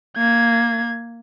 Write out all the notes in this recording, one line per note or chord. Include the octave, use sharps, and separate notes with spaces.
A#3 G#6